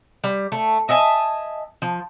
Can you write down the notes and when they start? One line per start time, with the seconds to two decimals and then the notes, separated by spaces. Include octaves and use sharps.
0.24 G3
0.52 A3
0.89 D#5 E5 G#5 A5
1.82 F3